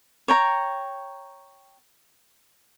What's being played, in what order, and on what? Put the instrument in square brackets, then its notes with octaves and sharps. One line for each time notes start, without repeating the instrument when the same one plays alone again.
[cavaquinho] C#5 G5 A#5